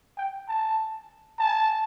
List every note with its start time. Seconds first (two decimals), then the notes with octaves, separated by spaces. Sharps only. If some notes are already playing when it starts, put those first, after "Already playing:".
0.17 G5
0.48 A5
1.39 A5